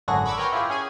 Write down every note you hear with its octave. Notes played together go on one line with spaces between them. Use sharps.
G#1 F#2 D3 F#4 G#4 A#6
B5 C#6 D6 E6 G#6
A#4 B4 C#5 G5 A#5 C6
E4 F4 G4 G#4
C#4 G#4 G#5